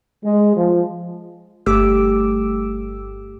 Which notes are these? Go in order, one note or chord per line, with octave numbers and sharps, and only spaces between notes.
G#3
F3
G1 G2 A3 G4 D6 E6